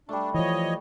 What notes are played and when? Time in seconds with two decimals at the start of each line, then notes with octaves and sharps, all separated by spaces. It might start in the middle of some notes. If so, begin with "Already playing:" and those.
0.09 G3 A3 D4
0.34 E3 F3 C#5 D#5